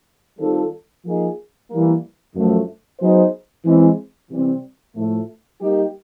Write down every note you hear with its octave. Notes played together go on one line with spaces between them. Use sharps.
D#3 G3 C4 F4 A4
F3 A#3 D#4 G#4
E3 G3 A#3
F#2 D3 F3 A3
F#3 B3 D#4 G#4 C5
E3 G#3 C4
C3 E3 G3 C4
A2 F3 A3
G3 A#3 D#4 G4